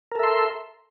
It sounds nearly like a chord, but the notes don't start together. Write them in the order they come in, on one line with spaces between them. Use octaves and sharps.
A#4 A4 E5 C6